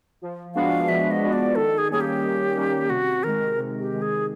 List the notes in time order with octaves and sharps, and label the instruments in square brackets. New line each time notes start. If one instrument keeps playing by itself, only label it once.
[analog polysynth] F3
[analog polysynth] G#3 B3 D4 F#4 [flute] F5
[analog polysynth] F3 [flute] E5
[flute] D#5
[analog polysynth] G#3 B3 D4 F#4
[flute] D5
[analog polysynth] D#3 [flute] A4
[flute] G#4
[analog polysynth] G3 A#3 C#4 [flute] G#4
[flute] G4
[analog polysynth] D#3
G3 A#3 C#4
[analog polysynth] C3 [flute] F#4
[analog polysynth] D#3 G#3 [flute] A#4
[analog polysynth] C3
[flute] G4
[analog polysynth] D#3 G#3
[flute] G#4